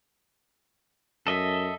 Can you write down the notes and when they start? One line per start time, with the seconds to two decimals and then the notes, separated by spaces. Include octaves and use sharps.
1.27 F#2 A4 D#5 E5